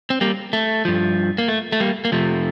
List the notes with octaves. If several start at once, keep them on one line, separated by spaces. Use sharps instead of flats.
C4
G3 A#3
A3
G2 F3
A#3
A3
A3
G3 A#3
A#3
F2 C3 F3 A3